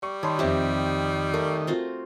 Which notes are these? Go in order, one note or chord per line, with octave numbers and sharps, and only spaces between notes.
G3 C#6
D#3 C#5 A5 B5 C6
F2 C4 G4 E5
A3 A#4
C4 F4 F#4